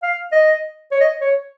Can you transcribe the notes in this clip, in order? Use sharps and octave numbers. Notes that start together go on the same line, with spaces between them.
F5
D#5
C#5
D#5
C#5